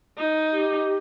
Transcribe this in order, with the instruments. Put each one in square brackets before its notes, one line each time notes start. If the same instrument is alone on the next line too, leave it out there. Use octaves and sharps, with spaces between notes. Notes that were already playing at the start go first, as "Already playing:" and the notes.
[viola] D#4
[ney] G4